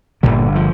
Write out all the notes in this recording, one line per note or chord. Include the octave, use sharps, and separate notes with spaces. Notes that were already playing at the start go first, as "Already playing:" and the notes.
G1 G2 A#2 D3 A#3
F3